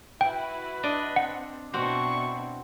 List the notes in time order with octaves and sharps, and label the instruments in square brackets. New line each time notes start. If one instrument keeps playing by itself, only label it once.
[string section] E4 F#4 [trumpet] B4 [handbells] G5
[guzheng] D4 D5 D#5
[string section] C4 [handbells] F#5
[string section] B2 D4 E4 [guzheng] C4 F#4 [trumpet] C#6